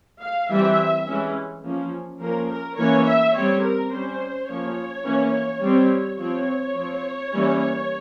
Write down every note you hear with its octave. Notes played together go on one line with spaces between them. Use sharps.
F5
E3 G3 C4 E5
E3 G#3 C#4
F3 A#3 C#4
F3 A#3 C#4 A#4
A#4
E3 A#3 C#4 C#5
E5
G3 C4 C#5
A#4
G3 C#4 C5
F3 A#3 C#4 C#5
E3 A#3 C#4
G3 C4
F3 C4 C#5
F3 C4
E3 G3 A#3 C#4